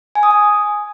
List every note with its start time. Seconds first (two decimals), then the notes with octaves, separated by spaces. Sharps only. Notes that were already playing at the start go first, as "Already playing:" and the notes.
0.15 G#5
0.23 D#6
0.31 G#5